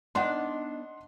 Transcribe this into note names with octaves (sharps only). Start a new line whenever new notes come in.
B3 D4 D#4 D#5 F#5 C6